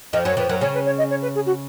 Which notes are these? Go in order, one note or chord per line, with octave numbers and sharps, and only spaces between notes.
F2 F3 D#5
F#2 F#3 C#5
F2 F3 B4
F#2 F#3 A#4
C#3 C#4 C#5
B4
C#5
D#5
C#5
B4
G#4
F#4